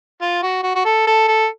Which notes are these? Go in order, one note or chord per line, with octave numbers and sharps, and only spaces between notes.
F4
F#4
F#4
F#4
A4
A4
A4